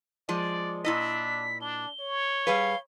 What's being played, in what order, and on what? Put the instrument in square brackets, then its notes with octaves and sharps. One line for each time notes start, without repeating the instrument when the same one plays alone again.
[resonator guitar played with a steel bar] F3 G#3 [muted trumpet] D5
[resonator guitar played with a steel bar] A#2 E4 D#5 [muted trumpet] D4 [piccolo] B6
[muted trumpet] D4 [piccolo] G7
[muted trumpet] C#5
[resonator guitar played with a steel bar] G3 G#4 B4 [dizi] F5